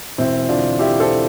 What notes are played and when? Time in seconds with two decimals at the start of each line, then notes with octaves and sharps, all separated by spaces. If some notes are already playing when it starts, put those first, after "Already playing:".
0.18 E1 C4 E4
0.49 D3 D4 F4
0.79 D3 E4 G4
1.00 A4 C5